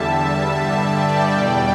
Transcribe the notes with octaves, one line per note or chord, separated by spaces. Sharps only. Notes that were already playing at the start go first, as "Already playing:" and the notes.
Already playing: E2 D3 G3 E5 A5
G2 D3 G3
D5 G5
E2 B2 G3 D5 G5